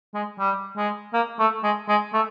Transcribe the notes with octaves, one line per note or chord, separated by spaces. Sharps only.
G#3
G3
G#3
A#3
A3
G#3
G#3
A3